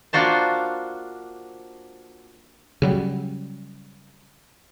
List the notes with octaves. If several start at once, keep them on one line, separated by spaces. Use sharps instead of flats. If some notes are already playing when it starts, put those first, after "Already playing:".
A#3 D4 F4 F#4 C5 A5
C#3 F#3 G3